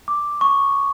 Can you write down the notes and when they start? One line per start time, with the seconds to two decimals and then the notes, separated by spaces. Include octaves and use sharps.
0.08 D6
0.41 C#6